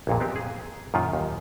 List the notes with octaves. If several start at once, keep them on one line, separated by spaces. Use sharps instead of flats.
A#1 F2 A#2
B3 C4 G4
G#4
F#2 A#2 D#3 F4
D#2